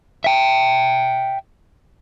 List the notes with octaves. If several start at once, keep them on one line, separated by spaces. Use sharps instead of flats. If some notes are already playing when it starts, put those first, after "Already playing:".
E5 G5